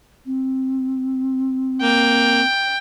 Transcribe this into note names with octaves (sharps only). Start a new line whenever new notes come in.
C4
A#3 G5